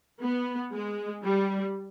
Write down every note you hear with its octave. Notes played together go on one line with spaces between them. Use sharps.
B3
G#3
G3